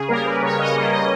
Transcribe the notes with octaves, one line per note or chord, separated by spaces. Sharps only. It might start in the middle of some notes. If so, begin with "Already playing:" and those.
Already playing: C#3 G#4
G3 A#3 A#4
B4
C#3 C#5
D#5
G3 A#3 D#5
D#5